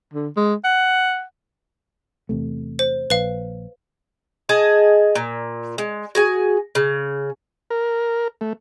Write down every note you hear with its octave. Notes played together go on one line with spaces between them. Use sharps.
D3
G#3
F#5
E2 C3 A3
C5
A#1 B4 F5
G#4 D#5 A5
A#2
G#3
F#4 G#4 G#5
C#3
A#4
A3